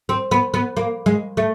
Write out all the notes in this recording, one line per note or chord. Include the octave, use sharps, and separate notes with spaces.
C4
B3
B3
A#3
G#3
A3